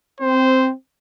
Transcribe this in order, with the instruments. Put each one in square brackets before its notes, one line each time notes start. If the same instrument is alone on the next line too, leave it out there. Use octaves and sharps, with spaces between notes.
[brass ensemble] C4 [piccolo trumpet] C5